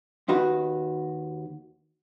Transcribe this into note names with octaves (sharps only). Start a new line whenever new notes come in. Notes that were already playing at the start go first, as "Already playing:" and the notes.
D#2 D#3 F#4 B4 F#5